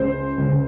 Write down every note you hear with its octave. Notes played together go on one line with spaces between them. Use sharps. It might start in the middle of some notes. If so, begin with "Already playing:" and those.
Already playing: C#2 C#3 C5
C#2 C#3